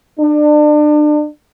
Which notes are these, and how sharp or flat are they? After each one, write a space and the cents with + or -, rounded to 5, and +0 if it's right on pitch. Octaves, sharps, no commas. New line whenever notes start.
D4 +30